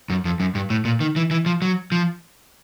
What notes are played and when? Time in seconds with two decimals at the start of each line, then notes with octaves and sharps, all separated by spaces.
0.10 F#2
0.25 F2
0.40 F#2
0.55 G2
0.70 A2
0.85 A#2
1.00 D#3
1.16 E3
1.31 E3
1.46 F3
1.62 F#3
1.92 F3